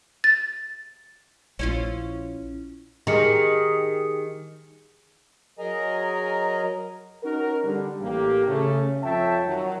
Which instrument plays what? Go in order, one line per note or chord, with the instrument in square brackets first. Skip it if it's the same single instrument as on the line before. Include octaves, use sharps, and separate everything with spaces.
[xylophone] A6
[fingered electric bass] A#1 [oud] C#4 E4 F4
[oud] D#3 [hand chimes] G4 G#4 C#7
[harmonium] F#3 G#4 A#4 D#5 G#5 A#5
[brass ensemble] C#4 D#4 F#4 A#4
D3 G3
A1 A#3 G4
C#3 A3 C#4
F2 F4 C#5 E5 G5 A5
D#3 F#3